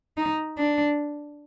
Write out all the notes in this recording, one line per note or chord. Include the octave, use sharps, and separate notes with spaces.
D#4
D4